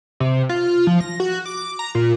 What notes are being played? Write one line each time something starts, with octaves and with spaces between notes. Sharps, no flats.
C3
F4
F3
A#6
F#4
D6
A#5
A#2